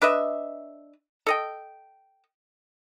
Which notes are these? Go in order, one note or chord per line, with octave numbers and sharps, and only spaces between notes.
D4 B4 D#5 E5
A4 D#5 G5